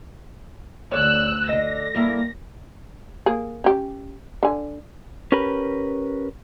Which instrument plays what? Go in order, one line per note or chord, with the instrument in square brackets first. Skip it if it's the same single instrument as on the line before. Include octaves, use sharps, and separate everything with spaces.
[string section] D2 E6 F#6 [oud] C#5 D5
[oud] D3 D#5 [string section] A#6
[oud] G2 A#3 E4
[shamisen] A#3 G#4
C#4 G4
D3 G#5
[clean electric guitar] C#4 G4 A#4 B4 B5